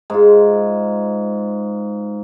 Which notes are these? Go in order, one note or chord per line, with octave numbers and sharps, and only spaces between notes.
G#2 F4